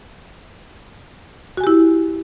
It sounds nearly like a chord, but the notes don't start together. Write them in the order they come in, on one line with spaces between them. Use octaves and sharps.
F#4 G#5 G4 E4